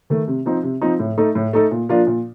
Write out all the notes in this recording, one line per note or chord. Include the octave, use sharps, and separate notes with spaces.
D#3 A3
C3
F3 C4 D#4
C3
F3 C4 D#4
A2
A3 D#4 A4
A2
A3 D#4 A4
A#2
F3 A#3 D4 F4
A#2